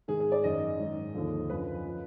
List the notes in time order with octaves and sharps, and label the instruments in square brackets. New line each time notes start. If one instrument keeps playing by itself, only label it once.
[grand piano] G#2 D#3 G#4
G#4
D5
F#2 D#3 D#5
G#2 D#3
D#2 D3 F3
F#2 F3 B4
F3